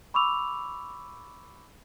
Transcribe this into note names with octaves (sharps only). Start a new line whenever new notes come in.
B5 C#6 D6 E6 F7